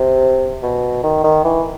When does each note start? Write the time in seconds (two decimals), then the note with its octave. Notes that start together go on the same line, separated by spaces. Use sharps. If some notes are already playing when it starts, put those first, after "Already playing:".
Already playing: C3
0.63 B2
1.03 D#3
1.24 D#3
1.44 E3